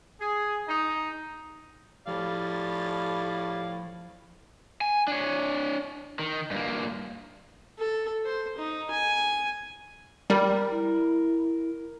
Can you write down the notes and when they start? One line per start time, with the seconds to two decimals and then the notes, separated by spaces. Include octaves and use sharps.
0.20 G#4
0.68 D#4
2.07 A2 F3 G3 D5 F5
4.81 G#5
5.08 D4 C#5
6.19 D#3
6.51 G2 A#3
7.78 A4
8.25 C5
8.58 D#4
8.91 G#5
10.30 G3 A#4
10.70 E4